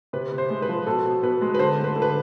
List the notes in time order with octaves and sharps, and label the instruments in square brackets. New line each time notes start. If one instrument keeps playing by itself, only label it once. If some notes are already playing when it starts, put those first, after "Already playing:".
[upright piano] C3 B4
C3
C5
G#3
B4
F3
B2 A4
B2
B2 B4
G#3
B4
D3 C5
A3
B4
D3
B4